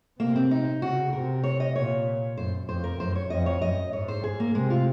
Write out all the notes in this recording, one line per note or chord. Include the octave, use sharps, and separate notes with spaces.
C3 A#3
C4
D#4
C#3 F#4
C3 A#4
C#5
D#5
A#2 C#5
F#2 C5
F2 C5
A#4
F#2 C5
C#5
F2 D#5
C#5
F#2 D#5
G#2 C#5
C5
G#2 G#4
A#3
C3 G#3
F4